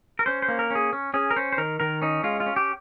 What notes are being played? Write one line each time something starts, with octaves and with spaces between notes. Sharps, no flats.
A#4
C#4 C5
C5
A#3
A#4
C#4
G#4
C#4
C#4 G#4
A#4
C#4 C5
C5
D#3 A#4
D#3 A#4
C#4 D#4
G#3 F4
F4
C#4
G4